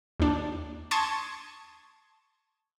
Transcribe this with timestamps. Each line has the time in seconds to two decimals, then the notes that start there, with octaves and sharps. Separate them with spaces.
0.20 D#2 D4
0.91 A5 C6 C#6 D#6 G#6